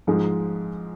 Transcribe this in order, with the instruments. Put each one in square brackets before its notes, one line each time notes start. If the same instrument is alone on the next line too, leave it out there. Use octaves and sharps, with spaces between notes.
[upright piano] G#2 F3 G#3